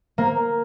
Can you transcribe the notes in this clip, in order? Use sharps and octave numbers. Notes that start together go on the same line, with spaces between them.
A#3